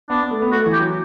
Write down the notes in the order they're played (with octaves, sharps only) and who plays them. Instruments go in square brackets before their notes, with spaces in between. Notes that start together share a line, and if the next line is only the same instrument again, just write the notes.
[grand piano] B3 [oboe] D4
[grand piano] B3
A3
B3
[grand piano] A3 [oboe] F#4
[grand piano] E3
[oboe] G4
[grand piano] F#3